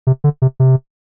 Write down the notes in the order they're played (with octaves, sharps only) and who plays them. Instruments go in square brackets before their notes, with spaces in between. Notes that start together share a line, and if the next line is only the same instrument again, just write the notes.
[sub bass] C3
D3
C3
C3